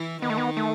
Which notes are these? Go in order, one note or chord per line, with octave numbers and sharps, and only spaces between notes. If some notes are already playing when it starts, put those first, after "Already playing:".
Already playing: E3 E4
D#3 B3 D#4
A3
B3
A3